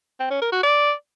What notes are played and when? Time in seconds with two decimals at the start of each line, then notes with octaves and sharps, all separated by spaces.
0.20 C4
0.31 C#4
0.41 A#4
0.52 F#4
0.63 D5